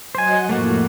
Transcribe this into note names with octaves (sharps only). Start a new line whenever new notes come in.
F#3 C5 D#5 F#5 G#5
F2 A2 A3 A#3 F#4